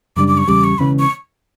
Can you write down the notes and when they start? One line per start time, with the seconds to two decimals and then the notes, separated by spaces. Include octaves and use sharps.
0.17 F#2 C#3 G3 D4 D6
0.28 D6
0.38 C#6
0.48 E2 C#3 G3 D6
0.64 C#6
0.78 E1 E2 C#3 E3 B5
0.99 C#6